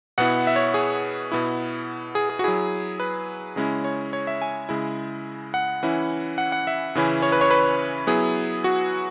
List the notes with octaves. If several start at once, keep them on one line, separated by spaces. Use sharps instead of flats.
B2 B3 E4 F#5
E5
C#5
G#4
B2 B3 E4
G#4
G#4
F#4
F#3 E4 G#4
B4
C#3 G#3 C#4 E4
C#5
C#5
E5
G#5
C#3 G#3 E4
F#5
E3 C#4 E4
F#5
F#5
E5
C#3 E3 C#4 E4
C#5
B4
C#5
B4
F#3 B3 E4 G#4
F#4